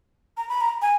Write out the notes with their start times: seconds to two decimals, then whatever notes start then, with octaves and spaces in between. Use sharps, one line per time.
0.37 A#5
0.49 B5
0.61 A#5
0.82 G#5